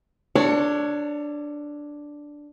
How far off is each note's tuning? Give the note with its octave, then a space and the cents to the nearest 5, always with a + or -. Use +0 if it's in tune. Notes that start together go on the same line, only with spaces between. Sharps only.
D4 +0 A4 +45 C#5 +5